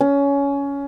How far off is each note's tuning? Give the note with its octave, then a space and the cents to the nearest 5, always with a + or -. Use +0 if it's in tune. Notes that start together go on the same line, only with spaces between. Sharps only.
C#4 +20